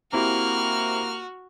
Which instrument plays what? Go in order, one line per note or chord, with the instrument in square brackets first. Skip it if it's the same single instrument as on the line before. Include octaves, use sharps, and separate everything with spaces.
[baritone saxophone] A#3 [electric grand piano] C4 E4 G4 [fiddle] F#4 [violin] F6